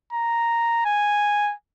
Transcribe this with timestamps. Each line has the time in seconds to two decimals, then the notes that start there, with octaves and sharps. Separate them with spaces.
0.13 A#5
0.85 G#5